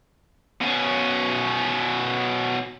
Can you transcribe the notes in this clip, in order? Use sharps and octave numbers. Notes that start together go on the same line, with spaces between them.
B2 C#4